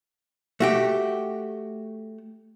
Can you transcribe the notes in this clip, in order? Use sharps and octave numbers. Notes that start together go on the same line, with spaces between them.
A3 F#4 G4